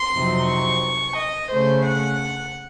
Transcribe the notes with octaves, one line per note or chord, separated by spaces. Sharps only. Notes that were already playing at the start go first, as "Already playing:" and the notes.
Already playing: C6
F2 C3 F#3 C4 D#4
C#6
D#5
C#3 A3 C#4 C5
F#5